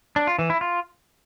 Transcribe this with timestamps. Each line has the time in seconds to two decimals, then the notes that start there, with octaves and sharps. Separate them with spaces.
0.16 D4
0.27 F4
0.39 E3
0.50 E4
0.61 F4